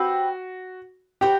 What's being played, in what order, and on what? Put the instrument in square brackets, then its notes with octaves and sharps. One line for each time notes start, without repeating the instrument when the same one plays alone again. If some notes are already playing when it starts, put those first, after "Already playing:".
Already playing: [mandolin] C4 G4 B4 [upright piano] F#4
[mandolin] F#4 C5 G5 [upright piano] G4